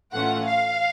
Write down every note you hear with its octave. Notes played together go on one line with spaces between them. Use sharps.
A2 E3 A3 C#4 F4 F#5
F5